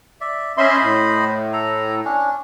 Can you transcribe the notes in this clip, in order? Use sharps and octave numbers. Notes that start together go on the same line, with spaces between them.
D5 E5
C#4 C5 D#5 E5 B5 C6
A2
A4 A#5
C#4 D4